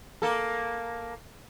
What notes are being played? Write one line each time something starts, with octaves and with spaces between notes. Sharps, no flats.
A#3 A4